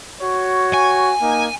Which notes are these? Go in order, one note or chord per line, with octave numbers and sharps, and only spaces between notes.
F#4 C#5
G#5
A#3 D#4